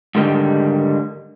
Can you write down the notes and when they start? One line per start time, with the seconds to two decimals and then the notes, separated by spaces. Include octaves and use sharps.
0.15 G#2 D3 D#3 G3